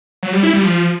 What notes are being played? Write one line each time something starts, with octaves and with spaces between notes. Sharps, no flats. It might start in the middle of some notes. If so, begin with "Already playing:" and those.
F#3
G3
E4
G3
F3